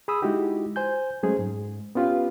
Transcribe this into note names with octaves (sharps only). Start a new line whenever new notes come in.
G#4 B5 D#6 E6
G#3 D#4 E4 F#4 G4
C5 G#5 G6
F#3 G#3 A3 C#4 G#4 C5
G#2
B3 C#4 F4 G4 B4 F5